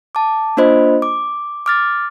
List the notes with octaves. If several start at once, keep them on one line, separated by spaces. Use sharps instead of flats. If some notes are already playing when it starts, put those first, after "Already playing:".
A5 D6
A#3 D4 F4 C5 D#5 B5
D6
D6 F6 A6